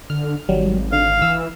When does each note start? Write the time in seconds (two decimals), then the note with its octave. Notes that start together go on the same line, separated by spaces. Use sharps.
0.10 D3 F6
0.49 G#1 F#3 G3
0.92 D3 F5
1.22 E3 E6